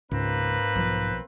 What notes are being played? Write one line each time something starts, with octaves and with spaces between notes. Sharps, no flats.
C#2 G#2 A#3 C4 B4
B1 F3